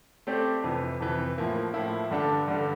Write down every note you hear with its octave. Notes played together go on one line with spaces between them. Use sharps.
A3 C4 G4 D5
F2 C3 E3
F2 C3 E3
A2 F3 A#3 E4
A2 F3 A#3 E4
G2 D3 G3 D4 A4
G2 D3 G3 D4 A4